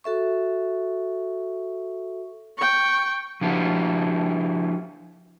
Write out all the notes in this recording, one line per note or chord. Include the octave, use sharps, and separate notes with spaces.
F#4 A4 E5 C#6
G5 C#6
F3 D4 E4 F#4 G4